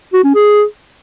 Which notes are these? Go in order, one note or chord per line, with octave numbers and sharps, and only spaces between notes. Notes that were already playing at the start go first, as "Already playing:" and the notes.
F#4
C#4
G#4